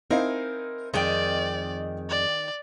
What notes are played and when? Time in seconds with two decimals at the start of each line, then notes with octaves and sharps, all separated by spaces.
0.11 C4 D#4 E4 A#4 F5 G#5
0.94 F2 D#3 G#3 D5 G5
2.10 D5